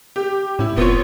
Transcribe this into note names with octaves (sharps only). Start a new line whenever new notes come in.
G4
A2 C#4 E4
F1 B3 C4 F4 C#5